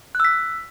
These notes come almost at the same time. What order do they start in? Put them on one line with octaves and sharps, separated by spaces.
F#6 E6 B6